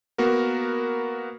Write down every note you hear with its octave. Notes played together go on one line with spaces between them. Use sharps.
A#3 B3 F#4 A#4